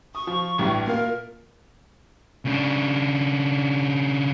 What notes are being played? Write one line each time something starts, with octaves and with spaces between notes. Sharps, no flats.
C#6 D#6
F3
A1 G2
A#2 A#4 F5
C#3 D4